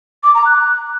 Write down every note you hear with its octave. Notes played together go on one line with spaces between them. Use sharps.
D6
A#5
F#6